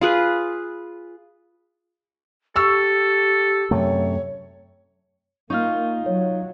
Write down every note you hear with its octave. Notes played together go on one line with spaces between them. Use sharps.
F4 G#4 B4
G4 A4 C#6 E6
F#2 C3 A3 C#5
A#3 D#4 F4 C#6 F6
F#3 C#5